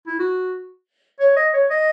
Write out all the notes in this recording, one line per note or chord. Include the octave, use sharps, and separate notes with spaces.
E4
F#4
C#5
D#5
C#5
D#5